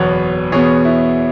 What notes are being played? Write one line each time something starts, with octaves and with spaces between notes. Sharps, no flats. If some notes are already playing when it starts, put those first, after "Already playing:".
Already playing: F#1 E2 B2 B3 C#5 F#5
E2 B2 B3 G#4 C#5
E4